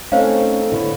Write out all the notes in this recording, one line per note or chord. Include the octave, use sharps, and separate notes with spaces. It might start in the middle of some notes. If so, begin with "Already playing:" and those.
A3 C4 C#4 D#4 A4 C5 F5
A2 D3 B3 C#5